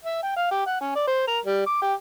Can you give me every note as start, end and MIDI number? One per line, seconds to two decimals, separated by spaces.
0.04 0.17 76
0.22 0.34 79
0.36 0.47 77
0.51 0.63 67
0.66 0.78 78
0.81 0.91 61
0.95 1.05 74
1.07 1.24 72
1.27 1.39 70
1.44 1.63 55
1.66 1.77 86
1.82 1.93 67